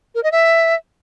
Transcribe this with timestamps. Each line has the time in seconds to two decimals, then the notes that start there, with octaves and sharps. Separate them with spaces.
0.15 A#4
0.23 D#5
0.32 E5